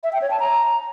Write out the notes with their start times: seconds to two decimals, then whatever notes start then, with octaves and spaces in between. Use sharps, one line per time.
0.04 E5
0.13 G5
0.22 C#5
0.31 A5
0.40 A#5